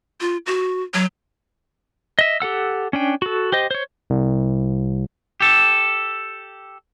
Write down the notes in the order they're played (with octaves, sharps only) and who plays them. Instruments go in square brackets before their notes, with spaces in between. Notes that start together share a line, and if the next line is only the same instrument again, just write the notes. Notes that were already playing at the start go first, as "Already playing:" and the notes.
[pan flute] F4
F#4
F#3
[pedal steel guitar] D#5 E5
G4 A4 F#5 E6
C#4 D4 G5
F#4 A4
G4 C5 D#5
C5 C#5
[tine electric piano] C2
[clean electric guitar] G4 A4